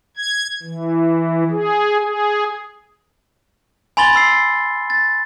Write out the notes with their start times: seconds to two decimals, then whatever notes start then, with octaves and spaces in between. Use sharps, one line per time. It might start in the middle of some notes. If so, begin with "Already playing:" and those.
0.17 G#6
0.63 E3
1.51 G#4
2.00 G#4
3.97 G#5 B5 C6 A6 G7
4.13 B5 C6 E6 C7
4.90 A6